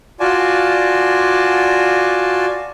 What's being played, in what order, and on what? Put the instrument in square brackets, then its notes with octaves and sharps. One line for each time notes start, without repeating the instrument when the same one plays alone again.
[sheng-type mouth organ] F4 F#4 D5 G#5 A5